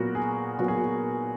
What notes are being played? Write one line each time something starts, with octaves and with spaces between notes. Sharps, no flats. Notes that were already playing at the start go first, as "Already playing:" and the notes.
Already playing: A#2 F#3 B3 F#4 A#4
G#4
A#2 F#3 B3 F#4
G#4
F#4